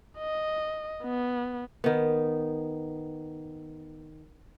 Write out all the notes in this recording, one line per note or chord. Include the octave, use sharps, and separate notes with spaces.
D#5
B3
D#3 B3